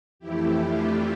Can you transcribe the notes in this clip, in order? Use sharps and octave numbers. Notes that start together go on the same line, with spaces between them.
F2 E3 A3 E4 G4
D4 F4